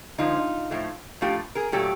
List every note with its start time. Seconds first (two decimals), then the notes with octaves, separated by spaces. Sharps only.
0.18 D3 F3 G#3 D#4 F4
0.71 A2 F3 A3
1.21 A2 F3 A3 F4 G4
1.55 G#4 A#4
1.72 A#2 F#3 A3 G4 A4